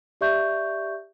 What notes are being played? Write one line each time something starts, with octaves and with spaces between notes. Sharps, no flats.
G4 D5 E5 C#6 G6